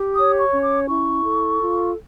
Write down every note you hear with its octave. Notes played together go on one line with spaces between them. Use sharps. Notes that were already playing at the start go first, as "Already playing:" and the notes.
Already playing: G4
C#5 D#6
C#6
C#4
D6
E4 C#6
A4
F4